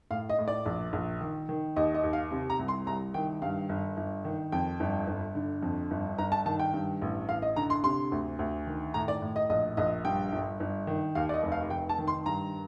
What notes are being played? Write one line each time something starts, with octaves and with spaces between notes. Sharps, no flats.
A2 F5
D#5
A2
D5
A#1
A#1
D#3
D#3
D#2 D#5
D#5
D#2
F5
C3
A#5
C2
C6
C2 A#5
D#3 G5
G2 F5
G1
G1
D#3
F2 G5
G1
G1
D3
F2
G1
G1 A#5
A5
D#3 A5
G5
G2
A1
A1 F5
D#5
D3 A#5
C6
C3 C6
D2
D2
D#3
A2 A#5
D5
A2
D#5
A#1 D#5
A#1 D#5
G2 G5
G1
G1
D#3
D#2 F5
D5
D#5
F1
F5
F1 G5
A5
D#3
C6
G2 A#5